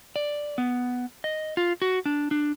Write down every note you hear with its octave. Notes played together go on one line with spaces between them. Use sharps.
D5
B3
D#5
F4
F#4
D4
D4